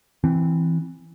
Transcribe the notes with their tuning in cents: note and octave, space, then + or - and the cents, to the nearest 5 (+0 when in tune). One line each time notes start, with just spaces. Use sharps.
E3 +0 C4 +0